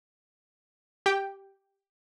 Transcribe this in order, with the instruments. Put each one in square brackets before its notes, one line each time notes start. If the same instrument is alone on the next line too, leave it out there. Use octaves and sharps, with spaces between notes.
[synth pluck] G4 G5